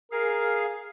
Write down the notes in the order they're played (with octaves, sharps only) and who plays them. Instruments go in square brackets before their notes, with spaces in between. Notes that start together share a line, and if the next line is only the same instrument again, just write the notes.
[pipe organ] G#4 F5 [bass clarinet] A#4